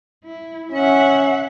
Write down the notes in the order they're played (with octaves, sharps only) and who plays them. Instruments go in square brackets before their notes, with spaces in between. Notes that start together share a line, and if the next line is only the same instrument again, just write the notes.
[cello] E4
[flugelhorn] C#4 [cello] E5 F#5